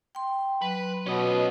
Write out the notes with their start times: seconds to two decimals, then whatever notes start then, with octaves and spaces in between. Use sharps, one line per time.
0.15 G5 C6
0.62 F#3 B4
1.06 B2 C#4 D#5